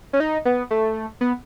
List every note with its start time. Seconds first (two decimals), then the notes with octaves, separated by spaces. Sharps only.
0.13 C#4
0.20 D#4
0.45 B3
0.71 A3
1.21 B3